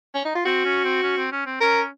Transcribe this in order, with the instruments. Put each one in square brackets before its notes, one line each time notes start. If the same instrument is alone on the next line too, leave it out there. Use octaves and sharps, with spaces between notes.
[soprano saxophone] C#4
D#4
F4
[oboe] C4 [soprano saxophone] F#4
[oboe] C#4
C4
C#4
C4
C#4
C4
[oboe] C#4 [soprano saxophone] A#4